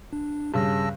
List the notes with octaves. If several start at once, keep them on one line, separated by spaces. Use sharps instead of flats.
D4
G2 C#3 A5 E6 A#6